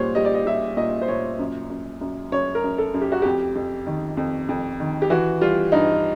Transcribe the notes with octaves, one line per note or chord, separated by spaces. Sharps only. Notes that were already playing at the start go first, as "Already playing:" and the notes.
Already playing: A#2 G3 C5 C#5
G3 D#5
D5
D#5
G3 E5
A#2 D#5
C5
A#2 C#5
F#2
F#2
F#2
F#2 C#5
A#4
F#2
A4
F#2
G4
F#4
F2 G4
F2
D#3
F2
F2
D#3
G4
E3 F#4
G3 F4
G2 D#4